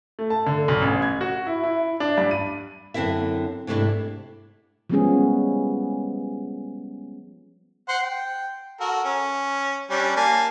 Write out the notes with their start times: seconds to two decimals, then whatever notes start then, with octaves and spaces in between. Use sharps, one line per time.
0.19 A3
0.30 A5
0.46 D3
0.68 B1
0.81 A1
1.02 G#6
1.21 F#4
1.47 E4
1.63 E4
2.00 D4
2.18 G2
2.31 D#7
2.94 F#2 D3 C4 E4 E5
3.67 G#2 C3 A3 D4 E4
4.90 F3 G3 G#3 B3 C#4 G#4
7.89 C5 F#5
8.03 G5
8.80 F#4 A4 A#4
9.04 C#4
9.90 G3 C#4 D4
10.16 A#3 G#5 A5